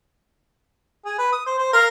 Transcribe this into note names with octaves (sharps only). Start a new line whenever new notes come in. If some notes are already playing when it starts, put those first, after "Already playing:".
G#4
B4
D#6
C5
C5
A#4 F5